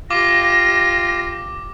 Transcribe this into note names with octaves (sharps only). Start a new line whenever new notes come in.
F4 G4 D6 A#6